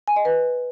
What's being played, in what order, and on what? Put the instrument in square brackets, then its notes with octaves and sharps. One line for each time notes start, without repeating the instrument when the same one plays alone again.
[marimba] G#5
D#5
B4